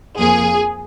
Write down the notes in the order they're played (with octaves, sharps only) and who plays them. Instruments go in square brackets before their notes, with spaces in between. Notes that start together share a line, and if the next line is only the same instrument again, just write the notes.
[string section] F2 F3 A#3 G#4